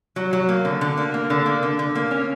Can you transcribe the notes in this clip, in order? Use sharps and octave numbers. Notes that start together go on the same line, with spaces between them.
F#3
F#3
A#3
D3
D3
A#3
A#3
D3
A#3
D3
D3
A#3
C#4